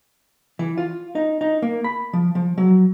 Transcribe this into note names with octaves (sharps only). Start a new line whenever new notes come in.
E3
F4
D#4
D#4
A#3
B5
F3
F3
F#3